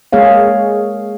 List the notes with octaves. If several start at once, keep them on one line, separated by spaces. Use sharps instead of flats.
G#3 A#3 G#4 C#5 F5